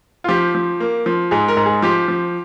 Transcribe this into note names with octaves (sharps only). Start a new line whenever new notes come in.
F4
F3 G4
F3
A#3
F3
G#2 G#4
A#4
G#2
G#4
F3 G4
F3